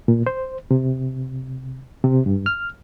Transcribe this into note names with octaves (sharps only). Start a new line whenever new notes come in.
A#2
C5
C3
C3
G2
F6